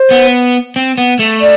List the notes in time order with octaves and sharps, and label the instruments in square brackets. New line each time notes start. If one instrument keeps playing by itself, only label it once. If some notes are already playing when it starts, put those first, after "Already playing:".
Already playing: [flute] C5
[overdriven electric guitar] B3
C4
B3
A3
[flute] D5